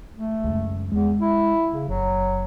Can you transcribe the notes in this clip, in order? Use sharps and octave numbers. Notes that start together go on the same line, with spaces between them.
A3
C#2 F#2
E2 G#3
E4
C#3
F#1 F#3